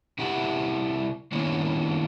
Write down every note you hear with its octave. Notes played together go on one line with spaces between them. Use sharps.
C3 E4 G4 E5 F#5 A5
D#3 A#3 B3 C#4 D4 E4